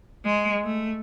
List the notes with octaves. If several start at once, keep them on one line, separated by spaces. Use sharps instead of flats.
G#3
A3